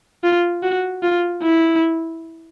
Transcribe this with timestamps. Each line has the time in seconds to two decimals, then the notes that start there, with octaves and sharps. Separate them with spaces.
0.24 F4
0.63 F#4
1.03 F4
1.43 E4